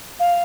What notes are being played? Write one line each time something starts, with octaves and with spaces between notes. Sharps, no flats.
F5